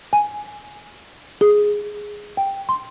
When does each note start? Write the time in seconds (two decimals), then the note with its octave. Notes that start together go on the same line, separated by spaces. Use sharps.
0.13 G#5
1.41 G#4
2.37 G5
2.69 C6